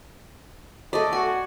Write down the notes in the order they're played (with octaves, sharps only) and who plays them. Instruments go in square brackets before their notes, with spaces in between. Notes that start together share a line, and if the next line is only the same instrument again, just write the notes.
[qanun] A3 D5 [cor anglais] D#5
[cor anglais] F#4 [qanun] G#5